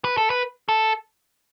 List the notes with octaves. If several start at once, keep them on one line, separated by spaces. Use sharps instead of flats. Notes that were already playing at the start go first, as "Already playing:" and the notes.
B4
A4
B4
A4